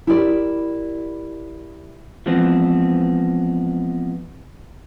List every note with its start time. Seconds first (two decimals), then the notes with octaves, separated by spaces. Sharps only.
0.07 E4 G4 A#4 D5
2.26 E3 F3 G#3 B3 C4